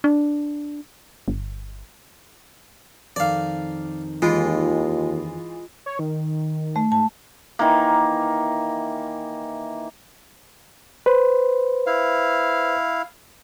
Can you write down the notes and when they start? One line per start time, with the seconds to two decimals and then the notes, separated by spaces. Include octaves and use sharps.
0.04 D4
1.28 G1
3.16 F2 D#3 D5 F5
4.22 D#2 E3 G#3 F4
5.86 C#5
5.99 D#3
6.76 A3
6.92 G#2 A5
7.59 D#3 E3 A#3
11.06 B4 C5
11.87 E4 F5